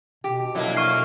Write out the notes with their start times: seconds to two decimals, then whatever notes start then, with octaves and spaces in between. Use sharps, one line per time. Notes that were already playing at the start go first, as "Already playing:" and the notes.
0.24 B2 G4
0.55 F2 F#3 A#3 D4 E4
0.77 C#6 F6 C7